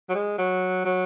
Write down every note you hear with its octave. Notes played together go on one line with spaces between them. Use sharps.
F#3
G#3
F#3
F#3